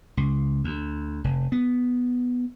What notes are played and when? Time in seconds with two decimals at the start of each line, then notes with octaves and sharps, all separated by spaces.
0.17 C#2
0.64 D2
1.24 F1
1.52 B3